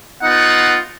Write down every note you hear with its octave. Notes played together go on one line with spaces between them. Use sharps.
B3 D#4 F4 F#5